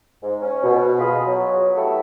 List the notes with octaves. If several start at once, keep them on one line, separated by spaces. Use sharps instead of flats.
G#2
C#4
B2
F4 G#4 D#5 B5
F#3
A3 B3 E4 G4 A4